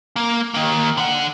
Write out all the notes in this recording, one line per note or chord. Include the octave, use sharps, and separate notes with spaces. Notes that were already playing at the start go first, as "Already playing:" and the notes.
A#3
D#3 A#3
D3 F#5